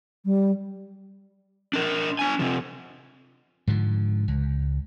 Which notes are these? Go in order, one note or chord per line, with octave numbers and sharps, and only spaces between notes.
G3
D4 A#4
D4 G#5
C3 F3
G#2 D3 F3
C#2